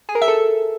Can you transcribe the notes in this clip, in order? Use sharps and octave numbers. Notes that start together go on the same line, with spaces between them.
G#4
A#4
E5
A4